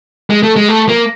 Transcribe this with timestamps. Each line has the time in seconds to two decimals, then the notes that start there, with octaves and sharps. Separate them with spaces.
0.30 G#3
0.43 A3
0.56 G#3
0.69 A3
0.89 A#3